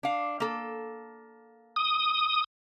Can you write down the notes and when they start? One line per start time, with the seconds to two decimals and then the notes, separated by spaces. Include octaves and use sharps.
0.03 D4 F5
0.40 A#3 A4
1.76 D#6